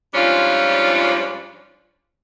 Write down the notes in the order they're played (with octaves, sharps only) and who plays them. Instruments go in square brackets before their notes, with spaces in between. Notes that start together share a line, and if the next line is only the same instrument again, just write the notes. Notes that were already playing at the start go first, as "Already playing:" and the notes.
[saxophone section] G#2 F3 G3 C#4 D4 F4